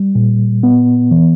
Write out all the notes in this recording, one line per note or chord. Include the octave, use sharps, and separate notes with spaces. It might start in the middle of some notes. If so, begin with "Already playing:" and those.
Already playing: G3
A#2
B3
E3